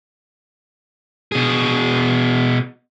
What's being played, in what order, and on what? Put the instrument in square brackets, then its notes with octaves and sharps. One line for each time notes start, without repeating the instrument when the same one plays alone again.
[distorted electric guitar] B2 G#4